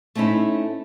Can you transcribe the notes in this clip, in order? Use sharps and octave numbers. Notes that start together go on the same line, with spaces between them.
A3 C4 C#4 D#4 E4